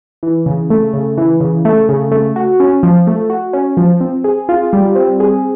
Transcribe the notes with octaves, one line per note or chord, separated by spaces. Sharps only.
E3
C#3
A3
C#3
E3
C#3
A3
C#3
A3
F#4
C#4
F3
A3
F#4
C#4
F3
C4
G#4
F4
G3
C4
G#4